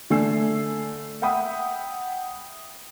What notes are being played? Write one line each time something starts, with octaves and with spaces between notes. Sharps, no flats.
D3 A3 G#5 E6 C7
E5 F#5 G5 B5 D#6